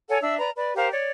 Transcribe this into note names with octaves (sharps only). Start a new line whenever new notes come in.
A4 C#5 F#5 G#5
D4 E5 E6
B4 D5 A#5
B4 D5
G4 A#4 C5 F5
C#5 D5